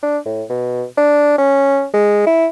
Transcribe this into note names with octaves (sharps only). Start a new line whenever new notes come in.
D4
A2
B2
D4
C#4
G#3
E4